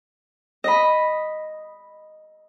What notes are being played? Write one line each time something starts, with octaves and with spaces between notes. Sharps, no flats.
D#5 B5